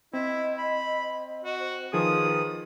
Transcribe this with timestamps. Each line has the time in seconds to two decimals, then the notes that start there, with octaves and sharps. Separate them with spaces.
0.13 C4 E4 D#5
0.58 B5
1.44 F#4 D#5
1.60 C5
1.93 D#3 F3 G#4 B4 D#6